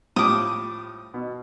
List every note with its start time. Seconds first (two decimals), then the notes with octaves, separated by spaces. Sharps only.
0.16 A2 F3 G3 D6 D#6
1.14 B2